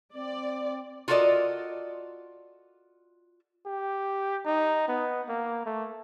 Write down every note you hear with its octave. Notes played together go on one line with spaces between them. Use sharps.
C4 D5
F4 F#4 A4 A#4 D5 D#5
G4
D#4
B3
A#3
A3